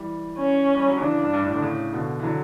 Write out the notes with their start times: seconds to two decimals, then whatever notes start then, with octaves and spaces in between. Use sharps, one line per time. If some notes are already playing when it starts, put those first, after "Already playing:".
Already playing: E3 G3
0.39 C#4
0.74 G3
0.88 F#3
1.00 C#3 E3 D4
1.21 G2
1.33 G2
1.42 A2
1.54 D3
1.62 A2 C#3
1.93 B2 D3
2.19 E3
2.23 D3 F#3